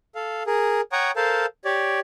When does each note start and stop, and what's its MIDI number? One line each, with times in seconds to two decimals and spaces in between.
0.15 0.43 69
0.15 0.43 77
0.47 0.81 68
0.47 0.81 70
0.92 1.11 73
0.92 1.11 78
0.92 1.11 79
0.92 1.11 82
0.92 1.11 85
0.92 1.11 87
1.16 1.46 69
1.16 1.46 70
1.16 1.46 72
1.16 1.46 77
1.16 1.46 81
1.65 2.00 67
1.65 2.00 73
1.65 2.00 74